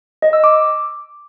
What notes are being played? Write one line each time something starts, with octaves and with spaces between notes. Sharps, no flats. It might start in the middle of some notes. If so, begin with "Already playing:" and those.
D#5
E6
D6